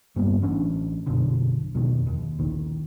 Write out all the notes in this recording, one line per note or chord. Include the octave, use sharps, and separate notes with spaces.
G2 G3 A#3 B3
A1 E3 C#4 D4
A#1 F#2 B2 D3
F2 B2 D#3
D#2
A#1 D#3